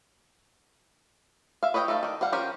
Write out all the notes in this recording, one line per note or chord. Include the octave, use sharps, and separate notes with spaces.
E5 F5
B4 C#5 D#5 F5 G5
A3 D#4 A4 F5
D#3 D5
G3 F5 F#5
F3 C#4 G4 A#4 C5